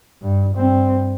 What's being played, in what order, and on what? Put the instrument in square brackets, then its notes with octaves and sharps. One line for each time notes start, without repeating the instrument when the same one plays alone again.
[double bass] G2
G2 C4